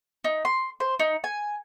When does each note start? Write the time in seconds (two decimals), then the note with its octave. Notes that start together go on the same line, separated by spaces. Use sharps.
0.24 D#4
0.45 C6
0.80 C5
0.99 D#4
1.24 G#5